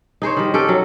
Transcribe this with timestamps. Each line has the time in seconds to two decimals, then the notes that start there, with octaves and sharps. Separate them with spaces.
0.22 D#4 G#4 C5 C#5
0.37 D#3 G3
0.54 C#4 G4 A4 G5
0.69 F#3